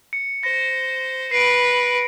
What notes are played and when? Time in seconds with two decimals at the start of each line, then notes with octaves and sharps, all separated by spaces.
0.13 C#7
0.43 C5 A#6
1.31 B4 C7 D7